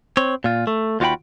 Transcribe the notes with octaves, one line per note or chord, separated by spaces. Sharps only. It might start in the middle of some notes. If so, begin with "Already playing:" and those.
C4 C#5
A#2 F4
A3
D#2 F4 F#4 B4 G5 B5